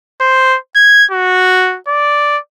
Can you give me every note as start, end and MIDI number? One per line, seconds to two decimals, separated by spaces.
0.21 0.57 72
0.76 1.05 92
1.11 1.78 66
1.88 2.38 74